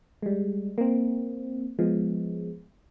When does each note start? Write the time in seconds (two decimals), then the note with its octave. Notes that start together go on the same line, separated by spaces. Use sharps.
0.22 G3 G#3
0.78 A#3 C4
1.79 F3 G#3 B3